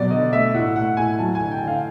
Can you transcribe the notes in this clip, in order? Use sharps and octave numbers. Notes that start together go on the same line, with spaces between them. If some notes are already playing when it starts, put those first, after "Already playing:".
Already playing: B2 F#3 D5
D3 D#5
A3 E5
A2 F#5
A3 F#5
A2 G#5
F#3 A5
G#5
D3
G5
D3
F5